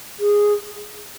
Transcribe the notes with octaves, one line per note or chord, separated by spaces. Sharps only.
G#4